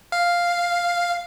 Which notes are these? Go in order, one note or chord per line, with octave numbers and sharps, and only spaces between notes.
F5